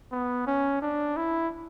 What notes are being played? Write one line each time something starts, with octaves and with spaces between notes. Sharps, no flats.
B3
C#4
D4
E4